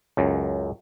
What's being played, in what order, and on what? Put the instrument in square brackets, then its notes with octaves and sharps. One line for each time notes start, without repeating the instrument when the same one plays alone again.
[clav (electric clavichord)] C#2 F#2